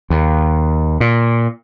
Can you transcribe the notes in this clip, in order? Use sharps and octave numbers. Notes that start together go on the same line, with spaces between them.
D#2
A#2